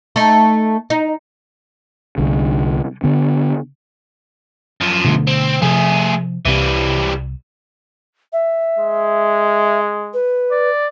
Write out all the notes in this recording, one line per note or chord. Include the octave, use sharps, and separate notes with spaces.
A3 D#4
D#4
C2 D3
D3 B3
F#2 F3
B2 D3 A3
C4
C3 F3 A3 G#4
C2 C3 E3 G3
E5
G#3
B4
D5